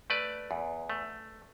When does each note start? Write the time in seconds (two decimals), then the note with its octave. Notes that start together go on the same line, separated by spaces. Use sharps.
0.10 A3 B4 D5
0.51 E2
0.89 A3